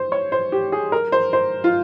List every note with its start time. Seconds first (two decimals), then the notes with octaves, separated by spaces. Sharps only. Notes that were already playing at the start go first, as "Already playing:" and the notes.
Already playing: C5
0.12 C#5
0.32 C5
0.52 G4
0.72 G#4
0.92 A#4
1.12 C5
1.33 C5
1.64 F4